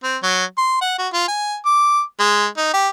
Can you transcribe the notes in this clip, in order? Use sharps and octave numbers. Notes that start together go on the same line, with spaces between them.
C4
F#3
C6
F#5
F#4
F4
G#5
D6
G#3
D#4
G4